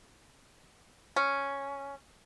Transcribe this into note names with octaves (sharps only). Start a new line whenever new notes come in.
C#4